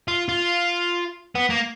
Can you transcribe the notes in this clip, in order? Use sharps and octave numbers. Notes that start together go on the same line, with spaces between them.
F4
F4
B3
A#3